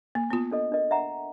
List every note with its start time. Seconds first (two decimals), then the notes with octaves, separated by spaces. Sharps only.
0.15 A#3
0.30 B3 F4
0.51 D4 A4 D#5
0.72 D4 A#4 D#5
0.91 E5 F#5 A#5